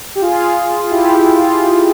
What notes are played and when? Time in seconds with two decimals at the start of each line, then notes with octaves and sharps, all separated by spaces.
0.15 G4
0.21 F4 G#4
0.81 F4
0.90 E4 G4
1.14 E4
1.36 F4